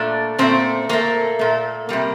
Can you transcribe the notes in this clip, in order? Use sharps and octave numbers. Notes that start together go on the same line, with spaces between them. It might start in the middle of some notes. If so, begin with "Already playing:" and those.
Already playing: A#2 A3 D4
A#2 A3 C4
A#2 A3 A#3
A#2 A3
C3 G3 A#3